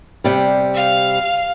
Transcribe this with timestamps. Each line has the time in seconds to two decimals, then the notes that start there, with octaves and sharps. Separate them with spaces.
0.24 C3 G3
0.74 F5